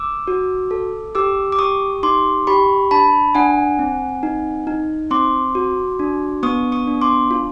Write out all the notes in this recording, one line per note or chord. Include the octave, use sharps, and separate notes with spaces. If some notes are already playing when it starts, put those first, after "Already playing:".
Already playing: D6 E6
F#4
A4
G4 D6 E6
D6
G4 C#6 D#6
D#4 C6 D6
G4 B5 C#6
D4 A5 B5
D4 F#5 G#5
C4
D#4
D#4
C4 C6 D6
F#4
D4
B3 C#6 D#6
C#6 D#6
D4
C6 D6
F4